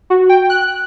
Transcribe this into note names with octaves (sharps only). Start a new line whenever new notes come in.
F#4
G5
F#6